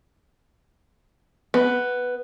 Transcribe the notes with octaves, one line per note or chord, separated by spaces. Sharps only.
B3